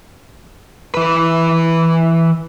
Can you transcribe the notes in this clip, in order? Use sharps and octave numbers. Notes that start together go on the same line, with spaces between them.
E3 B4